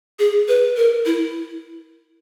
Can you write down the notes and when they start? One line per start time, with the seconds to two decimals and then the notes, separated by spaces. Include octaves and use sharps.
0.19 G#4
0.48 B4
0.77 A#4
1.06 E4